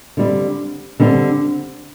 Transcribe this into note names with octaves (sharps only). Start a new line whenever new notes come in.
D3 G3 C4
D3 G3 C4